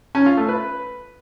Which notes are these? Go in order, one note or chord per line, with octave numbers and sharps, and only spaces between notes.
C#4
F4
A3
B4